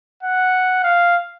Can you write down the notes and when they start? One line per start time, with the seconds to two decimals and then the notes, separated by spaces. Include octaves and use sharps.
0.23 F#5
0.84 F5